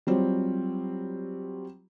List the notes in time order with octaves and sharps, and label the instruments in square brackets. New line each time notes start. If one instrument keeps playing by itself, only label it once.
[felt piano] F#3 G3 C4 F4